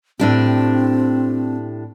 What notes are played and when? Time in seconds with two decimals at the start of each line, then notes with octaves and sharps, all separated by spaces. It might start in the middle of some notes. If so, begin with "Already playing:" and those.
0.19 A2 C4 D4 G4